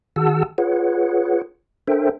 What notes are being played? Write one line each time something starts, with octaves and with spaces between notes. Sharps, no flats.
D#3 F#4 G#4 F#5 A5 E6
F4 G#4 B4 C#5 F#5
D4 A4 A#4 C5 E5 G5